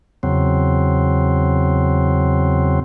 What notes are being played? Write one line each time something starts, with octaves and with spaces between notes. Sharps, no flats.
E2 C#3 F#3 C4